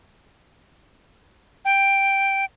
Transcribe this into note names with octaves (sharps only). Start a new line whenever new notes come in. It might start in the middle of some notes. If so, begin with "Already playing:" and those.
G5